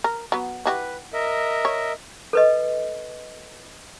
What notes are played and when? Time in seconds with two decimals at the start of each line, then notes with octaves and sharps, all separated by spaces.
0.04 A#4
0.32 F#3 B3
0.66 E4 F#4 G4 B4
1.13 A#4 D#5 E5
1.65 C#5
2.33 A4 B4 D#5